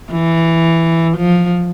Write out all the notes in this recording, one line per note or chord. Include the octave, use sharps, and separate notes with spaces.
E3
F3